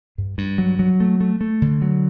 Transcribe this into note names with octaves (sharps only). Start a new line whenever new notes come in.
G2
G2
F#3
F#3
A3
A3
A3
D3
F#3